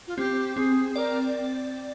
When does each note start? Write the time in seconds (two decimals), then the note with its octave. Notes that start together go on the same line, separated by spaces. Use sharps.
0.08 F4
0.18 C4 G4
0.56 C4 G#4
0.96 A#4 D5